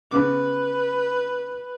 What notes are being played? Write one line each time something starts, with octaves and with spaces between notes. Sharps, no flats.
C#3 B3 B4 D6